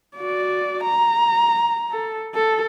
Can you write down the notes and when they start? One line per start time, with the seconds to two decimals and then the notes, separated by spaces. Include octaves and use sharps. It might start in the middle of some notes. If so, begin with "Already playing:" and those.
0.16 F#4 D5
0.84 A#5
1.91 A4
2.35 A4